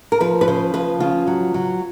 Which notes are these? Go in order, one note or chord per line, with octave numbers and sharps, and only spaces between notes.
A#4
F3 B4
B4
C#3 C5
F3 B4
C#3 F4
F#3
F#3